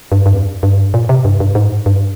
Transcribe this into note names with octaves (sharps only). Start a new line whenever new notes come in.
G2
G2
F2
G2
A#2
C3
G2
G2
G#2
G2